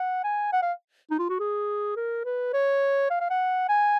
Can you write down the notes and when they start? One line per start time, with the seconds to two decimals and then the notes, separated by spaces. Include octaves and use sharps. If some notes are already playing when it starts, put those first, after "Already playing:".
Already playing: F#5
0.24 G#5
0.53 F#5
0.62 F5
1.10 D#4
1.19 F4
1.29 F#4
1.39 G#4
1.96 A#4
2.25 B4
2.54 C#5
3.10 F5
3.20 F5
3.30 F#5
3.69 G#5